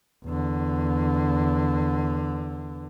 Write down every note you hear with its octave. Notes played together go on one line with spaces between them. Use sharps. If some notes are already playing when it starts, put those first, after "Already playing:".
E2 D3